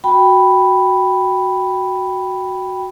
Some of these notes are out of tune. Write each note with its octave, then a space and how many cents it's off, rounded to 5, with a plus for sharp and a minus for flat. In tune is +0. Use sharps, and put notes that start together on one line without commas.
F#4 +0 G5 +0 B5 +0